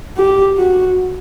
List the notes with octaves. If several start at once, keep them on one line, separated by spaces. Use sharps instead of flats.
G4
F#4